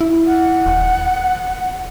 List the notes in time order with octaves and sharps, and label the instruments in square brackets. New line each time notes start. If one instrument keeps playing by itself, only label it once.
[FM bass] E4
[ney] F#5
[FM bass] D#1